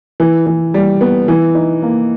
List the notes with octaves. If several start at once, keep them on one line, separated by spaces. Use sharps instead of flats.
E3
E3
G3
B3
E3
D#4
A#3